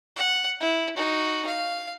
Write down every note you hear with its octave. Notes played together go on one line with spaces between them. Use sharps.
F#5
E4
D#4 F#4
F5